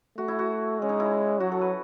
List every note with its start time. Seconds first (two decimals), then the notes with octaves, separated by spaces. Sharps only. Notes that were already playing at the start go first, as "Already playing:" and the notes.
0.17 A3 F#4
0.28 E4
0.39 F#4
0.79 G#3 C#4
0.89 D#4
1.00 E4
1.40 F#3 F#4
1.51 A4
1.61 B4